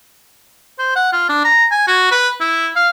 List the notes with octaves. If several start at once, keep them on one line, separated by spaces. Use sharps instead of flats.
C5
F#5
F4
D4
A#5
G#5
F#4
B4
E4
F5